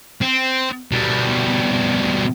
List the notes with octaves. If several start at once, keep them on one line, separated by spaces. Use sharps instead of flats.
C4
B2 G3